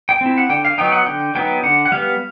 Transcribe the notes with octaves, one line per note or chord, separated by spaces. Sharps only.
G5
C4 E4
F#5
D3 G5
F5
F#3 B3 D#4 G5
F#5
D3 G5
F#3 B3 D#4 G5
D3 F#5
F#5
G3 B3 F5